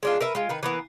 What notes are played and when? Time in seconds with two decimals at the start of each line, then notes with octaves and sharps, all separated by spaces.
0.03 G#3 D4 F4
0.21 A#4 B4 E5
0.35 G#3 F4
0.49 D#3 B4
0.63 E3 A#3 B3